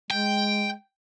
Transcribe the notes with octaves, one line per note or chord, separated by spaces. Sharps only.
G#3 G5